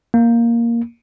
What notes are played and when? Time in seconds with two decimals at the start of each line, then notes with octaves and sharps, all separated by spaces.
0.14 A#3